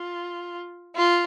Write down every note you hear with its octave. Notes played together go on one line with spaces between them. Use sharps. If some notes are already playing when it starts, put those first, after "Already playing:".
Already playing: F4
F4